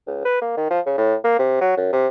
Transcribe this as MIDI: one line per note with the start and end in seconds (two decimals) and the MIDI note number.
0.07 0.24 37
0.25 0.42 71
0.42 0.56 58
0.57 0.69 51
0.70 0.80 53
0.86 0.97 49
0.98 1.15 45
1.24 1.39 58
1.39 1.57 48
1.61 1.76 54
1.77 1.91 42
1.93 2.08 48